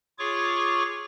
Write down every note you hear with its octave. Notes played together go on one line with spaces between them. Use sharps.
F4 G#4 C#5 C#6 D6